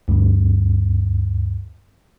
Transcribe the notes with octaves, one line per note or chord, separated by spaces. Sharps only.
D2 G2